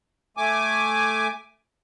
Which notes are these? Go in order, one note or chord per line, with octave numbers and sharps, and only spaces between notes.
A3 G#5 D6